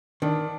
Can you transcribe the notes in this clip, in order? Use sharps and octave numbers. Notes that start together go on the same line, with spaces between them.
D#3 D4